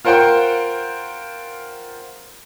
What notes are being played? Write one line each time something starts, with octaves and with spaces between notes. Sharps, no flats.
F4 A#4 C5 F#5 G5 C6